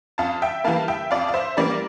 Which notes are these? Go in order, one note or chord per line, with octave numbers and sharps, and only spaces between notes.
F2 F5 A5
E5 G5
E3 G3 A#3 F5 A5
E5 G5
F2 D5 F5
F5
C5 E5
E3 G3 A#3 A#4 D5